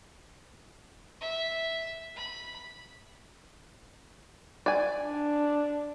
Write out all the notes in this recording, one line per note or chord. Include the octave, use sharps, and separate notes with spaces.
E5
B5
D5 G#5
D4